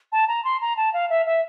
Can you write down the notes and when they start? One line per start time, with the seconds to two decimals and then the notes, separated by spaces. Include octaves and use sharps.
0.12 A5
0.28 A#5
0.45 C6
0.61 A#5
0.77 A5
0.93 F5
1.10 E5
1.26 E5